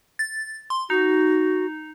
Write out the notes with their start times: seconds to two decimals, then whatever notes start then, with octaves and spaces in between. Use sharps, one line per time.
0.19 A6
0.70 C6
0.90 D#4 F#4